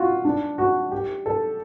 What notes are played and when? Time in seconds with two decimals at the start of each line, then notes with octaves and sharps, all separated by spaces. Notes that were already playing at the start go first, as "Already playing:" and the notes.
Already playing: F4 F#4
0.25 D4
0.58 F#4
0.91 G4
1.26 A4